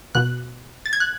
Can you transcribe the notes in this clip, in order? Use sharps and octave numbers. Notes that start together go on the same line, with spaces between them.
B2 F#6
A6
G#6
F#6